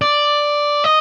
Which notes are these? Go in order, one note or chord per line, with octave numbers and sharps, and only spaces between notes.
D5
D#5